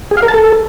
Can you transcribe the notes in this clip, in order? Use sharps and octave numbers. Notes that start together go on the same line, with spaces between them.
G#4
F5
A#4
A5
A4